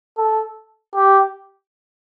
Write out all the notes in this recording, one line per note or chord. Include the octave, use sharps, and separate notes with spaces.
A4
G4